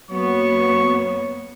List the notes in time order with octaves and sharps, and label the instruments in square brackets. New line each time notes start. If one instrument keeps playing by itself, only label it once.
[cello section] F#2 A#3 B3 [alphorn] F#3 [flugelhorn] C#5 [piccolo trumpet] C#6